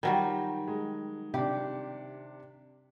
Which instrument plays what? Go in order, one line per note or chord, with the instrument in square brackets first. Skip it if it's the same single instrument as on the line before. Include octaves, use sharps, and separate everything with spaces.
[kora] D#3 F#3 G3 [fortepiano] G5
[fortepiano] G#3
[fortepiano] C3 D4 [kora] G4